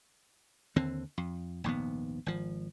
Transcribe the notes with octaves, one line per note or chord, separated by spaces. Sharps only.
D#2 D3 C4
F2
A#1 D#2 G#2 B3
G#1 F3